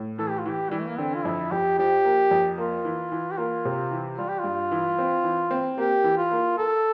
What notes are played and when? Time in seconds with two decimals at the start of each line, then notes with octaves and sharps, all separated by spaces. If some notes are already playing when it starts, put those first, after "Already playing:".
Already playing: A2
0.18 E3 A4
0.29 G4
0.39 F4
0.46 E3 G4
0.70 E3 G3
0.79 A3
0.89 A#3
0.99 D3 C4
1.15 F4
1.25 F2 E4
1.52 F2 G4
1.78 F3 G4
2.05 A#3
2.31 F2
2.58 A#3 F4
2.85 E3
3.12 E3
3.31 G4
3.38 A#3 F4
3.65 C3
3.91 E3
4.18 G3 F4
4.29 G4
4.39 G2 F4
4.71 E3
4.98 C4
5.24 E3
5.51 C4
5.78 A#3 G4
6.04 E3
6.18 F4
6.31 A#3
6.58 A4 A#4